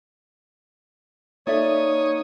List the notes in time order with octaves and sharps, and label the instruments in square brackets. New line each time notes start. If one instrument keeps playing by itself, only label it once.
[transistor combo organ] A#3 D#4 D#6 [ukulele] A4 D5 E5 [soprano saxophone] C#5